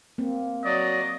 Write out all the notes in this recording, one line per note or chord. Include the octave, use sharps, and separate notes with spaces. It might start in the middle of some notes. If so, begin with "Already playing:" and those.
A#3 C4
F#3 D5 D#5